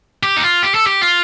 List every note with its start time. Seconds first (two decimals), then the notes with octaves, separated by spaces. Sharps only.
0.23 G4
0.37 D#4
0.44 F4
0.63 G4
0.75 A4
0.87 G4
1.02 F4